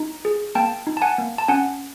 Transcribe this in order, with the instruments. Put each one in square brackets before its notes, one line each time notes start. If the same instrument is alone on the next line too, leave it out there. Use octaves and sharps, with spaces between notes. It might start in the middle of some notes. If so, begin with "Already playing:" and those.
Already playing: [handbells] D#4
G#4
A#3 G5 A5
D#4
A5
F#5 G#5
A#3
A5
C#4 F#5 G#5